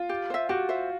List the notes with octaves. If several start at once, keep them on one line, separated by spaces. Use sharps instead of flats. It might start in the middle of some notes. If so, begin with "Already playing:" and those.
Already playing: F4
G4
C5 E5
F#4 G4
C5 E5